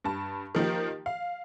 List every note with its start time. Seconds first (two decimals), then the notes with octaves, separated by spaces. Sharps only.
0.04 G2 A5
0.55 D#3 F3 A#3 G4
1.06 F5